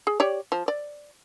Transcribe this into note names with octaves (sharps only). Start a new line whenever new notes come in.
G#4
G4 C#5 D5
F3
D5